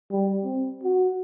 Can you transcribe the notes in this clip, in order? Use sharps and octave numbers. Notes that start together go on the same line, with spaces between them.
G3
C4
F#4